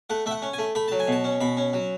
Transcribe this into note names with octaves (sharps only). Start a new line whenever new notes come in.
A3 F#5
A3 E5
F#5
C#4
G#5
A3
A3 B5
F#3 A5
G#5
B2 A5
C#4
B2 B5
C#4
F#3